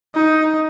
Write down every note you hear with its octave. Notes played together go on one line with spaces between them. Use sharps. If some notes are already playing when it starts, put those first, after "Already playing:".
D#4